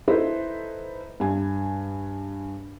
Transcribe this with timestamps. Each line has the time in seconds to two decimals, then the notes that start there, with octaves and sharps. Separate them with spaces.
0.08 D#4 E4 A4 B4 C5
1.20 G2 G#5